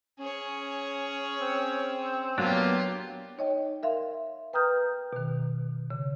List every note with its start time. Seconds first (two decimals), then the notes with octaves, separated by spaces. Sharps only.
0.19 C#4 G#4 C#5
1.40 C4
2.38 F#3 A#3 B3 D4 F4 G4
3.38 D#4 C#5 D#5 G5
3.83 A#4 E5 F5 C6
4.53 B4 G5 A#5 D#6 F6 G6
5.13 B2 D#3
5.90 C#3